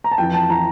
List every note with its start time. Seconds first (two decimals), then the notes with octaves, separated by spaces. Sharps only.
0.04 A#5
0.11 A5
0.18 F2 E3 G5
0.34 A5
0.50 E3 A#5